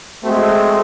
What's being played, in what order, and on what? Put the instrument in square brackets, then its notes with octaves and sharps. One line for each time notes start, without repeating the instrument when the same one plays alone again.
[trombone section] G#3 A3 C4 F#4